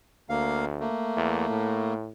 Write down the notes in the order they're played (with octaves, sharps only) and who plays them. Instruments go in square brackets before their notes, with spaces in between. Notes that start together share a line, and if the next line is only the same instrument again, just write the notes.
[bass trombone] D2 [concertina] A#3 F5
[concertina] A3 A#3
[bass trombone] E2
A2